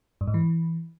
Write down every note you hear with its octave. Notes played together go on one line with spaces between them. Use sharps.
G2
G#2
E3